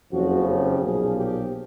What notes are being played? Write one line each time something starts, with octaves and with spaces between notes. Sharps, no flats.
F#1 F2 C#3 F3 F#4
G4
B1 A#2 F3 G#4
G4